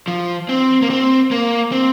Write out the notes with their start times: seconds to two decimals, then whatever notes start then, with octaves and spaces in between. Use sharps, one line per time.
0.08 F3
0.49 C4
0.82 A#3
0.90 C4
1.31 A#3
1.72 C4